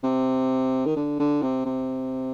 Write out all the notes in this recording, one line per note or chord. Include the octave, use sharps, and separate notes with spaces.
C3
D#3
D3
D3
C3
C3